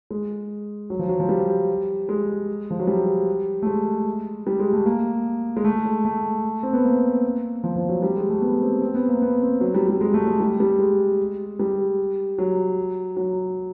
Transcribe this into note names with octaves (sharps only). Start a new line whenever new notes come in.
G#3
F#3
F3
F#3
F3
G3
G#3
F3
F#3
G3
A3
G#3
G3
G#3
A3
A#3
G#3
A3
G#3
A3
C4
B3
A#3
F3
F3
F#3
G3
G#3
A3
B3
C4
C4
B3
A#3
B3
C4
F#3
G3
G3
G#3
A3
G#3
G3
G3
G#3
G3
F#3
F#3